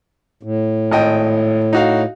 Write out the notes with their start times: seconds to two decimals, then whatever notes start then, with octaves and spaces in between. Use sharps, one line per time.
0.43 A2
0.91 G#1 D#5 G5
1.73 D#4 F#4 F5